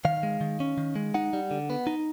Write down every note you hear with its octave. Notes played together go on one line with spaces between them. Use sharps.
D#3 F5
G#3
D#3
C#4
D#3
G#3
D#4 F#5
G3
D3
B3
D#4